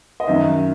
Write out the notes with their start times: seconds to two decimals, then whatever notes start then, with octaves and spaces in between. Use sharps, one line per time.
0.20 D#5
0.27 F#2 D#3 E5